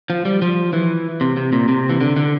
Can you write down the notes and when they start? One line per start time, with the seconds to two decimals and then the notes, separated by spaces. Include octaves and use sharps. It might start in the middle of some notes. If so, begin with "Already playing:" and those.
0.10 F3
0.25 G3
0.42 F3
0.73 E3
1.21 C3
1.37 C3
1.53 A#2
1.69 C3
1.89 E3
2.01 D3
2.16 D3